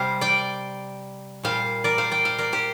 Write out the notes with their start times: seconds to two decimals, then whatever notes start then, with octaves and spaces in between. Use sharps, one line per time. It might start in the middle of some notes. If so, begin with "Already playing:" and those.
Already playing: C3 G3 C5 F5
0.21 D5 G5
1.43 A#2 G3 C5 F5
1.84 A#4 D5
1.98 C5 F5
2.11 D5 G5
2.25 C5 F5
2.38 A#4 D5
2.53 G4 C5